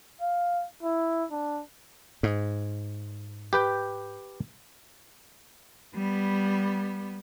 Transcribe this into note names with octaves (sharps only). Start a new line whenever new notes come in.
F5
E4
D4
G#2
G4 B4 G5
G3 B3